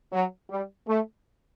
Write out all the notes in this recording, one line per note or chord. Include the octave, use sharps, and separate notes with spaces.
F#3
G3
A3